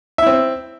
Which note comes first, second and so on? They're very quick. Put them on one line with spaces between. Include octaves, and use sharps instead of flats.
E5 E4 C4